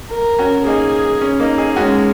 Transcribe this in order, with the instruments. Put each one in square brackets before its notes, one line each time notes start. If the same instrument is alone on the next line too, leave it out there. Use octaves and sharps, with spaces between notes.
[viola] A#4
[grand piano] C#4 F#4
[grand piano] A#3 D#4 [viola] G#4
[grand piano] C#4
A#3 D#4
D#4 G#4
[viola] G#3 [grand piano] C#4 F#4